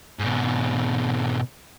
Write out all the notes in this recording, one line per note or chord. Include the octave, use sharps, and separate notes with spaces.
G#2 B2